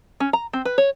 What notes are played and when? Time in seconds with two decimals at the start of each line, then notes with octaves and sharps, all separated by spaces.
0.20 C#4
0.33 A#5
0.53 C4
0.65 B4
0.78 C#5